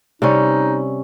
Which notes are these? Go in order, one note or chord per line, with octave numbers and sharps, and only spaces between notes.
C3 G3 C#4 D#4